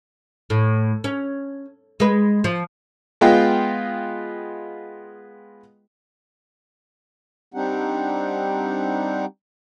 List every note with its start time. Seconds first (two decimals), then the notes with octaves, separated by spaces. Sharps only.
0.50 A2
1.04 C#4
2.00 G#3 B4
2.44 F3
3.21 G#3 B3 F4 D#5 G5
7.54 G3 C4 D4 D#4 G4 F#5